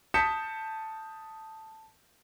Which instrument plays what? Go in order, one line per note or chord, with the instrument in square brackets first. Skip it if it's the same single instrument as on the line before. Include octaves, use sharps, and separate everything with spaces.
[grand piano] A5 D#6 G6 B6 C#7 E7